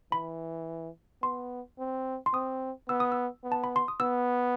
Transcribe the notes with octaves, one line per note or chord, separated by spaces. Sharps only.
E3 B5
B3 C6
C4
C6
C4 D#6
B3 E6
D#6
E6
B3
A5
B5
C6
D#6
B3 E6